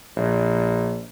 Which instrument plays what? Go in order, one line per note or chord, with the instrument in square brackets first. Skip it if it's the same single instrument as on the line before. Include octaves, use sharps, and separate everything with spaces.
[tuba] A#1